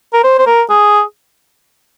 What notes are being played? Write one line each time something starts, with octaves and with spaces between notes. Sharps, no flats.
A#4
C5
C5
A#4
G#4